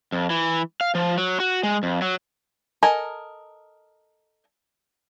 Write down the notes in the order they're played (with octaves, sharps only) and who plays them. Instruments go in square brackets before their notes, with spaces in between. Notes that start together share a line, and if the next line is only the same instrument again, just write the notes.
[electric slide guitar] F2
E3
F5
F3
F#3
F#4
G#3
F2
F#3
[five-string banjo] A4 A#4 D#5 G#5